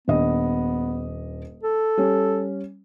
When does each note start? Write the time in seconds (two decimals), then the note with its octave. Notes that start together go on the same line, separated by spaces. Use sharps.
0.08 D#1 B3 D4 D#5
1.63 A4
1.98 G3 C#4